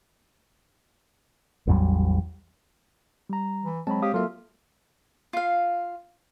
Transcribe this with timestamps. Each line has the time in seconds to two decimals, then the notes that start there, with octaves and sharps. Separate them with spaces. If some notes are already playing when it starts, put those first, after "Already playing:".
1.67 A1 E2 F#3 G3
3.29 G3 A#5
3.63 E3
3.87 F#3 G#3 C4 A5 B5
4.02 G4 C#5 F5 D#6
4.14 F#3 A#3 F4 A4 E5
5.33 F4 F5